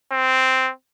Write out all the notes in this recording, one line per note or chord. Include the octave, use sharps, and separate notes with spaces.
C4